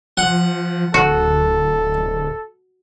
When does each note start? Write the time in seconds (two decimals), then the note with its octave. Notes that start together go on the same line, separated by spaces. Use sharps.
0.17 F3 F#5
0.94 D1 F#4 A4